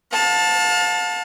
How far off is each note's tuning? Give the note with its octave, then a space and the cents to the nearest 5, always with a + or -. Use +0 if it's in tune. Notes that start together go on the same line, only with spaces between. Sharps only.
F5 +40 A5 +0